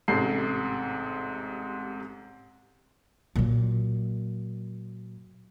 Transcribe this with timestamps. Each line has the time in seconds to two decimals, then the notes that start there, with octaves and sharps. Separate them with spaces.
0.08 A1 G#2 C3 A4 C7
3.36 A#2 F#3